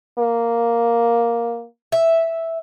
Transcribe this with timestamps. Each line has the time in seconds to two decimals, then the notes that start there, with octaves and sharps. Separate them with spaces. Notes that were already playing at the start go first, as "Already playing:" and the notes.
0.18 A#3
1.92 E5